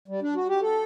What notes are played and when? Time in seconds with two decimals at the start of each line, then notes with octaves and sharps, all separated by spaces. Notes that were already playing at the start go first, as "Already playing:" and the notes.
0.08 G3
0.22 D4
0.35 F#4
0.48 G4
0.61 A4